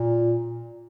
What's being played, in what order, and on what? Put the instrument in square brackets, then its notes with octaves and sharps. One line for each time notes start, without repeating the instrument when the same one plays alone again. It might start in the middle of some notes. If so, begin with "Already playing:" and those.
Already playing: [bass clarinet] A#2